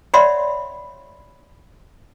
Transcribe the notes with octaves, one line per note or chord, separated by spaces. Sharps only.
C#5 D5 E5 F#5 B5 C6